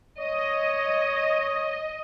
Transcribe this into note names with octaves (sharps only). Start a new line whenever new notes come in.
C#5 D#5